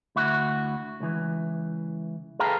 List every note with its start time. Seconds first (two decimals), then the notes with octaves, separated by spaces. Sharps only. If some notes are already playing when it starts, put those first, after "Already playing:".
0.16 D2 E4 F#4
1.00 C#2 E3
2.39 G#4 A4 B4 F5 G5 A#5